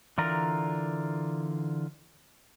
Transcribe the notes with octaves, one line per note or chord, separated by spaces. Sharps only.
D3 E3 F4 A#4 D5 A#5